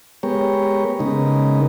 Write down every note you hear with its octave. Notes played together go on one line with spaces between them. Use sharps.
G#3 B3 G4 A#4 C#5
C#3 G#3 B3 D#4 A#4